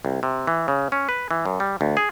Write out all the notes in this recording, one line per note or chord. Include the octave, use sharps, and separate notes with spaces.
C2
C3
E3
C#3
C#4
B4
E3
F#2
G3
D2
G#4